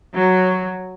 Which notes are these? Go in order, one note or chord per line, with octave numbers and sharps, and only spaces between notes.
F#3